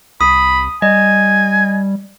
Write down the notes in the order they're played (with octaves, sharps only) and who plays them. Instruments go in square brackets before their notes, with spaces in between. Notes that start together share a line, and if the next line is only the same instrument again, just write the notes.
[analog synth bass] C2 [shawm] B5 [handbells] D#6
[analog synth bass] G3 [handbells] D#5 [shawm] G#5